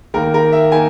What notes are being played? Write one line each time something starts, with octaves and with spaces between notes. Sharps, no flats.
D#2 D#3 A#3 A#4
A#4
E5
D#3 A#3 G#5